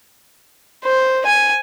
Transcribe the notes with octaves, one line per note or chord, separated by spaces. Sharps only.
C5
G#5